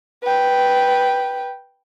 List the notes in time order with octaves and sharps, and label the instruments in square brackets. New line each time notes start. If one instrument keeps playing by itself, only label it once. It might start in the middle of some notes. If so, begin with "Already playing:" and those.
[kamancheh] B4 G5